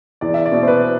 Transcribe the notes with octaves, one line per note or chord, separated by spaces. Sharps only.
E2 D5
E5
D5
B2
C5
B4